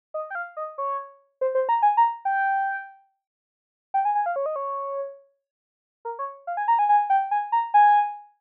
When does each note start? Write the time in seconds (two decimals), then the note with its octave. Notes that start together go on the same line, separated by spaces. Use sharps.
0.14 D#5
0.30 G5
0.35 F5
0.57 D#5
0.78 C#5
1.41 C5
1.55 C5
1.69 A#5
1.82 G#5
1.97 A#5
2.25 G5
3.94 G5
4.05 G#5
4.15 G#5
4.26 F5
4.36 C#5
4.46 D#5
4.56 C#5
6.05 A#4
6.19 C#5
6.47 F5
6.57 G#5
6.68 A#5
6.79 G#5
6.89 G#5
7.10 G5
7.31 G#5
7.52 A#5
7.74 G#5